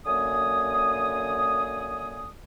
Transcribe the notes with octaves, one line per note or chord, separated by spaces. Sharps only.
F#2 D3 A#3 G#5 D#6